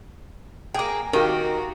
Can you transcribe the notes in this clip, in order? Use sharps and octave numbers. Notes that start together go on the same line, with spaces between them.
A#3 G#4 G5 D6
D#3 A#3 F#4 G4 A#4